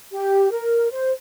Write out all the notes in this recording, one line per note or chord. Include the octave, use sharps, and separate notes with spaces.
G4
A#4
C5